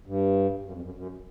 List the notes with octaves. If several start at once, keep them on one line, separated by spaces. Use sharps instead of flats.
G2
F#2
F2
F#2
F#2